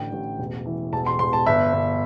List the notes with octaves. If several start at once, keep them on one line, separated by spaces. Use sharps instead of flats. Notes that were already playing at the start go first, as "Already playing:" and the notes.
Already playing: A1 D3 G5
A1
E1
E3
E1 A5
C6
E1 C6
A5
G1 E5
G1